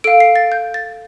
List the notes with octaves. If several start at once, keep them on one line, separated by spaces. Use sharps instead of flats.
A4 F5 D7
C7
A6
G6
A6